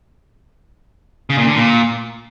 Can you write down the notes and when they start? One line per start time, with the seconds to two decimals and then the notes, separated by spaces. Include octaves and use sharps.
1.30 C#3
1.38 A#2
1.47 D3
1.55 A#2